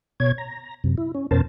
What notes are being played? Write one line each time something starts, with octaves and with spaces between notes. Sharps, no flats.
B2 C#5 G#6
A#5
F#2 C3
E4
C#4
F2 B2 C#4 A#4 C5 A5